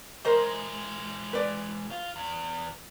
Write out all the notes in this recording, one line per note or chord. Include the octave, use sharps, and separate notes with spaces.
E3 G#3 A#4 C5 D#5
B4 D5
F4
E2